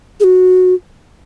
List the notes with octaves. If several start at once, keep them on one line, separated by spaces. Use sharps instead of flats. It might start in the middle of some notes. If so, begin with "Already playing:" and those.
G#4
F#4